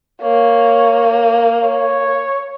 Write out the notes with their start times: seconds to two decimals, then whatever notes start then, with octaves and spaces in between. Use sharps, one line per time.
0.22 A#3 C#5
1.63 C#5